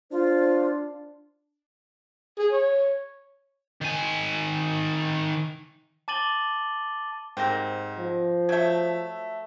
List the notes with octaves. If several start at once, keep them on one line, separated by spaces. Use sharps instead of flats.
D4 F4 C5
G#4
C#5
D#3 G#5
A5 D6 A6 D#7 F#7 G7
G#2 G3 A#3 C4 A#6
F3
F#3 A3 E5 G6 G#6